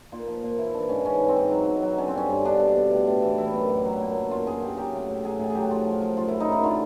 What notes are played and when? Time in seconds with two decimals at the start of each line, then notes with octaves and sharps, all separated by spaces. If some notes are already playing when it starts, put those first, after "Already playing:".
0.12 A#2 F4
0.28 F3
0.43 A#2
0.58 E3 E4
0.74 E3 D4
0.89 G#2 C#4
1.05 E3 C#4
1.20 G#2
1.28 C4
1.37 G#2
1.51 F#3
1.68 B2
1.82 F#3
1.98 D3 C#4
2.08 C4
2.13 G2 C#4
2.30 G2
2.44 B2 D4
2.60 B2
2.76 B2
2.92 A2
3.07 A2
3.22 E3
3.38 E3 E4
3.54 F#2
3.69 F#2
3.85 F#3
4.00 A#2
4.16 F#3
4.30 F#2 F4
4.47 F#2 G#4
4.62 C#3 G4
4.77 F#3 G4
4.93 A2
5.08 A2
5.25 F#3 G#4
5.39 A2 G#4
5.50 G#4
5.55 F#3 G4
5.64 F#4
5.71 F3 F4
5.87 F3
6.01 F3
6.17 F#2 F4
6.28 C#3 E4
6.40 D#4
6.48 F#2 E4
6.63 D3 F4